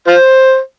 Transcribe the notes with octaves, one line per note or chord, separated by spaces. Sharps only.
F4 C5